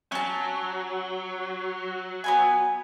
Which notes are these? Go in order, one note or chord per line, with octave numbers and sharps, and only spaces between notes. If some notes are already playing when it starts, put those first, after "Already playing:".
F#3 C#4 A5
B3 B4 G#5